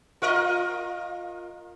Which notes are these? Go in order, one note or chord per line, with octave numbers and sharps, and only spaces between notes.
F4 A#4 D#5